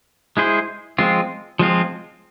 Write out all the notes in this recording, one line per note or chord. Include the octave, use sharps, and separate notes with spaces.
G#3 E4 G#4 C5
F3 G#3 C4 F4
F3 G#3 C4 F4